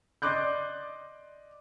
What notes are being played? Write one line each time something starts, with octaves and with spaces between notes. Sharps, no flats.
D5 D#5 C6 D6 F#6 G6